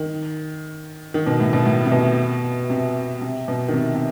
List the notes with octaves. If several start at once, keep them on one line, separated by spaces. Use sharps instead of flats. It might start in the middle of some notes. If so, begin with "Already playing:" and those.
Already playing: D#3
D#3
B2
A2
B2
A2
C3
B2
C3
C3
B2
D#3
C3
C3